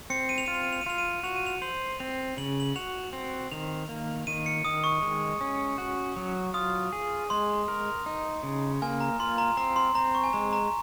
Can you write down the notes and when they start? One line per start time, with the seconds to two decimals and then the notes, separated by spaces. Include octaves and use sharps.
0.10 C4 C#7
0.29 D#7
0.38 F7
0.46 F4 D#7
0.54 F7
0.63 D#7
0.73 F7
0.81 D#7
0.86 F4 F7
0.98 D#7
1.23 F#4 F7
1.36 D#7
1.47 F7
1.62 C5 F#7
2.00 C4 F7
2.37 C#3 F#7
2.60 F#7
2.76 F#4 F7
3.13 C4
3.52 D#3 F7
3.89 A#3
4.27 D#3 D#7
4.46 C#7
4.65 D#3 D#6
4.84 C#6
5.02 G#3
5.41 C#4
5.78 F#4
6.16 F#3
6.54 F4 D#6
6.93 G#4
7.30 G#3 C6
7.68 A#4
8.06 D#4
8.43 C#3
8.82 A#3 G#5
9.01 A#5
9.20 F4 C6
9.38 A#5
9.57 C4 A#5
9.76 C6
9.95 C4 A#5
10.15 C#6
10.24 G#5
10.33 G#3 A#5
10.53 A#5